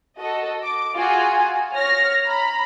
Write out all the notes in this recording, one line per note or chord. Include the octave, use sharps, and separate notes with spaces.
F#4 A4 D#5
D6
F4 F#4 G#4 G#5
C#5 F6 A#6
A#5 B5